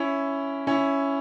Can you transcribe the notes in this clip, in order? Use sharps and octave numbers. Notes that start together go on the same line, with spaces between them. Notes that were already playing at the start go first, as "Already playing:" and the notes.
Already playing: C#4 E4
C#4 E4